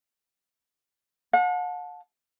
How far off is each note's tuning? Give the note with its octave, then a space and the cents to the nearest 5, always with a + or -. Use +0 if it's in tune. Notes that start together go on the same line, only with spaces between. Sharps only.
F#5 -40 A5 -10